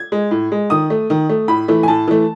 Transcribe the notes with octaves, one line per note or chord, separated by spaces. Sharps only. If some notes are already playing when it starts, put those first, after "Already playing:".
Already playing: G#6
G#3
A2
G#3
D#3 D#6
A3
D#3
A3
A2 B5
E3 A3
G#5
A2 A5
E3 A3